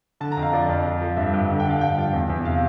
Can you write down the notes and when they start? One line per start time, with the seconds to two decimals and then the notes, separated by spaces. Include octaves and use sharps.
0.21 D3 A5
0.32 A#5
0.37 F2
0.42 F5
0.53 F3 D5
0.69 F2
0.85 F3
1.01 F3
1.17 G2 E5
1.33 G2
1.49 D3
1.60 G5
1.65 D3 F5
1.81 G2 G5
1.97 F3
2.13 E2
2.29 E2
2.45 C3 F5